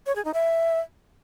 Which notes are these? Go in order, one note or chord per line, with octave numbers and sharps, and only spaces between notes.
C#5
G#4
D#4
E5